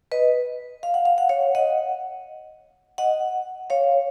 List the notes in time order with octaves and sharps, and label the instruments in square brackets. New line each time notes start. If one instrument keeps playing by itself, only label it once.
[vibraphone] B4 D#5
F5
F#5
F5
F#5
C#5 F5
D#5 F#5
D#5 F#5
C#5 F5